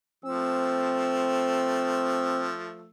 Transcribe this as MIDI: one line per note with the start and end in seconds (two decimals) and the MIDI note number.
0.25 2.90 53
0.25 2.90 57
0.25 2.52 60
0.25 2.90 88